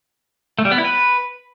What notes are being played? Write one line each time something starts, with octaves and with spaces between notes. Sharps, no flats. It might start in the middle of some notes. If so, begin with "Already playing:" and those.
A3
G3
B3
E4
B4